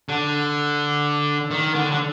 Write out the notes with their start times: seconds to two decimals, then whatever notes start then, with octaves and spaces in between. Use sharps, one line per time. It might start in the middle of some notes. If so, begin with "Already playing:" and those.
0.08 D3
1.51 D#3
1.74 D3
1.92 D3